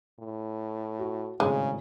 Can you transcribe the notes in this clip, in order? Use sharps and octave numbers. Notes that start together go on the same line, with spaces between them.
A2
F#4
G#1 A2 C#3 G#3